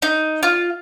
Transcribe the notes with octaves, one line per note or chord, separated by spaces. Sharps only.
D#4
F4